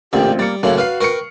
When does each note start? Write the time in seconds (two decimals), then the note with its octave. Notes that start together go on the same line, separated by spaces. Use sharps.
0.13 A1 A#2 D3 C4 F4 G4
0.39 G3 A#3 A6 C#7
0.63 F#2 A2 C#3 A#3 F#4 A4 F#7
0.78 B4 F5 F6 C7
1.01 A#4 B4 G5 C#6 C#7